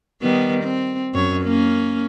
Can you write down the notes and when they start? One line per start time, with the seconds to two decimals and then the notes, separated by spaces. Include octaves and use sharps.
0.21 D#3 G3 B3
0.64 C4
1.14 F#2 C#5
1.43 A#3 C#4